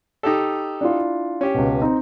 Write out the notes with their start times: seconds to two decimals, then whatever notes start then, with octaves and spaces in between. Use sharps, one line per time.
0.23 D#4 G4 A4
0.81 D4 E4 F4
1.41 C#4 G4
1.54 C#2 B2
1.82 C4 D#4